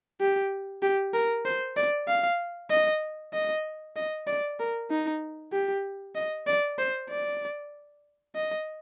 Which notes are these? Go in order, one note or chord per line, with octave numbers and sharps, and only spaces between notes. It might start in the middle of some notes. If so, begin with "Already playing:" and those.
G4
G4
A#4
C5
D5
F5
D#5
D#5
D#5
D5
A#4
D#4
G4
D#5
D5
C5
D5
D#5